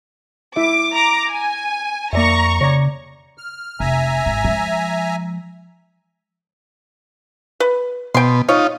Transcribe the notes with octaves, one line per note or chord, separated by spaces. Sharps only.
E4 E5 D6
A#5 D6
G#5
F2 A#3 D5 E5 A#5 C#6
C#3 C#5 D5
F6
F1 E5 G#5 A#5
G#1
F3 G#3
B4
B2 G5 C6
D#4 F4 C#5